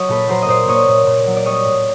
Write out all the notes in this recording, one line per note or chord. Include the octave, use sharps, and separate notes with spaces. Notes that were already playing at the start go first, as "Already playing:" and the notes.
Already playing: F#3 C#5 D#5
A#2 A4 B4
F#3 A#4 C5
D#5
A#2 C5 D5
A#2 C#5 D#5
A#2
A#2
F#3
D5
G3 C#5 D#5
A2